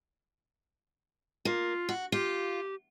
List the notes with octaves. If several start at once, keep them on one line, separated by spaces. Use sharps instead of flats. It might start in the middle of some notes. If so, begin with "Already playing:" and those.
A#3 F4
F#4
F4 G4